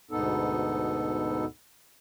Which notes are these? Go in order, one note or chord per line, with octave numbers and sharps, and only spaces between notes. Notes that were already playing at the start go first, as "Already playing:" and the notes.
D2 G#2 B2 B3 D#4 A4